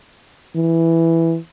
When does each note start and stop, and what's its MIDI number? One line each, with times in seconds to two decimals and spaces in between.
0.56 1.37 52